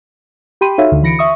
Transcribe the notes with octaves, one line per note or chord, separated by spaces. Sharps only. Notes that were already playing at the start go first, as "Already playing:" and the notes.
G4 G5 B5 C6 D#7
D#4 F#4 A4 C#5 E5 F5
D2 D3
E3 B5 A#6 C#7 D7
E5 C#6 D#6